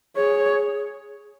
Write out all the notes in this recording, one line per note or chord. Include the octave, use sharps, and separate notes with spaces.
G#4 C#5